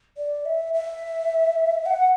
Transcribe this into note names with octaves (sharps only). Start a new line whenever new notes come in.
D5
E5
E5
F#5